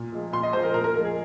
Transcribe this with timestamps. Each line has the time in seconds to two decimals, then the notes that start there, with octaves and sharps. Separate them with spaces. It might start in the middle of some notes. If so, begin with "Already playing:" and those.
Already playing: A#2
0.12 F3 G#3
0.33 A#2 C6
0.43 D#5
0.53 F3 G#3 C5
0.63 A#4
0.74 A#2 A#4
0.84 A#4
0.94 F3 G#3 A#4
1.04 G#4